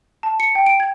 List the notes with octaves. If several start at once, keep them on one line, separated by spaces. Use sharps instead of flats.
A5
C#7
G5
D7
G#6